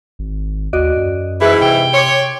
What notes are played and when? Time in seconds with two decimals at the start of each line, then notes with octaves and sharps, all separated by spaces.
0.19 G#1
0.73 D#2 F#4 D5 D#5
0.96 F#2
1.41 G#2 E3 E4 G#4 B4
1.62 C3 G5
1.94 C#5 C6 D6